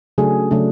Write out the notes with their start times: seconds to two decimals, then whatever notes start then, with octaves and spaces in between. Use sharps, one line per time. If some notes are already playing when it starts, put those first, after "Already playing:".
0.18 C#3 F#3 A3 D4 G#4
0.51 C#3 F#3 A3 D4